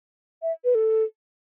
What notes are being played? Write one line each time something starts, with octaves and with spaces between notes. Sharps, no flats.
E5
B4
A4